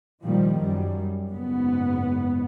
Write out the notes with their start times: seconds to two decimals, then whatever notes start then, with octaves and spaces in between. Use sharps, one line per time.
0.23 A#2 D#3 F3 G3
0.57 F#2 G3
1.28 F#1 G#2 B3